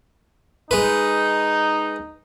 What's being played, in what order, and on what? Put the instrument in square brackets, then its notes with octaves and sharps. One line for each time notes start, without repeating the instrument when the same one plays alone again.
[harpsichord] G#3 B4 [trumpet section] D#4